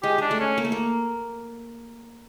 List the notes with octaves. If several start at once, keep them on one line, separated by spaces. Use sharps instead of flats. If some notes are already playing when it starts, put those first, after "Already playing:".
G#3 G4
G#3 D4
A3
C#4
A#3
A3
A#3